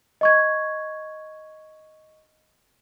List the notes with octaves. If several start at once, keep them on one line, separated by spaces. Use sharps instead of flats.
D#5 C#6 G#6